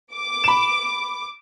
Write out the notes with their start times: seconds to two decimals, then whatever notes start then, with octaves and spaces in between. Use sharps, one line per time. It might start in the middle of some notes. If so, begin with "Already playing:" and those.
0.14 D6
0.44 B5 E7